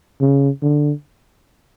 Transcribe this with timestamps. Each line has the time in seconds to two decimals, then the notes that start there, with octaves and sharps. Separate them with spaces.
0.20 C#3
0.62 D3